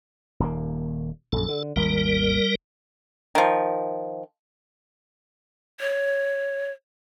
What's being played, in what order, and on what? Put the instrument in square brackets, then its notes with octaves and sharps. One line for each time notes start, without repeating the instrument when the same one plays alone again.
[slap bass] D#1 D#2 A#3
[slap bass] A#1 F#2 [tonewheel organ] A4
[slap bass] D3
[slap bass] G#1 D#2 [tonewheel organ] G3 A#4
[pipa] D#3 F3
[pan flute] C#5